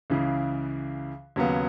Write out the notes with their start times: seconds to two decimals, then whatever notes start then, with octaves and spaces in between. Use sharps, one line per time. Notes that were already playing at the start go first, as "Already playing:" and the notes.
0.10 C#2 C#3 E3
1.36 D#2 C#3 F#3 B3